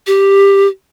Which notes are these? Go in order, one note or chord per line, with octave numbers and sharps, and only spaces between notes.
G4